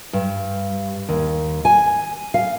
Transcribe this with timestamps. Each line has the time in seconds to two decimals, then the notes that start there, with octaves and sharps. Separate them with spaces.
0.13 G2
1.09 D#2
1.65 G#5
2.34 F5